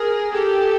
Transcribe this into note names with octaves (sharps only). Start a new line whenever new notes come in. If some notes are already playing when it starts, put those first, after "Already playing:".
Already playing: G#4 A#4
G4 A4